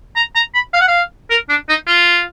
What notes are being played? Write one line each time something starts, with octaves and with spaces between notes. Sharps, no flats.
A#5
A#5
B5
F5
F#5
F5
A#4
D4
D#4
F4